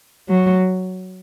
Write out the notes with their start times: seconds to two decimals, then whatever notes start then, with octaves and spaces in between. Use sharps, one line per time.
0.28 F#3